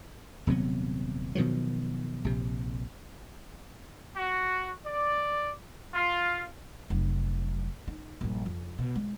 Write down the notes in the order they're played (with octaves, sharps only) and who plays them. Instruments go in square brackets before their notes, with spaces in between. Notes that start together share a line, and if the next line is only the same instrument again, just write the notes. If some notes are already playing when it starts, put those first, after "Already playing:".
[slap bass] D#1 C3 F#3 B3
B2 D#3 F3 F#3
A#1 C3
[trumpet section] F#4
D5
F4
[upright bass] F1 F#3
D#4
A#1 G2
F2
B2
G#3